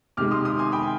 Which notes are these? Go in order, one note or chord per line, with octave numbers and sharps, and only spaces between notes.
C3 D#3 G#3 D6 F6
C6 D#6
C6 D#6
G#5 C6
G5 B5